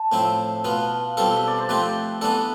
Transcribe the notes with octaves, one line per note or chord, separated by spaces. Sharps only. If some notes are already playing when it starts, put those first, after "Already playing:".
Already playing: A5
A2 F3 C4 E4
B2 B3 F4 F5
B2 G3 C4 F4 A4
E5
D5
C5
F3 A3 C4 G4 B4
E3 B3 D4 A4